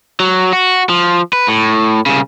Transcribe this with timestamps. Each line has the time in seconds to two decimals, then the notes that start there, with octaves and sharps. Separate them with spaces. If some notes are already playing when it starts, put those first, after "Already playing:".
0.20 F#3
0.53 F#4
0.89 F3
1.33 B4
1.48 A2
2.06 C2 C#3